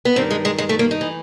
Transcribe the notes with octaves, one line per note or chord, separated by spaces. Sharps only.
B3
G2 D#3 C4
G#3
G#3
G#3
A3
A#3
D#4
E3